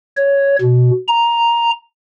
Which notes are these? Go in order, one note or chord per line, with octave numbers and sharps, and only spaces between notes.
C#5
B2
A#5